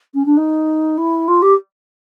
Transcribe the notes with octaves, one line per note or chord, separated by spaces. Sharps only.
C#4
D4
D#4
E4
F4
G4